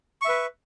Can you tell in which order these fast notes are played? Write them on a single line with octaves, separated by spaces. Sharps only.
C#6 E5 B4